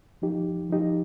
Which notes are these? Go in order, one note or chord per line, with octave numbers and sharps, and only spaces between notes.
F3 D#4 G4
F3 D#4 G4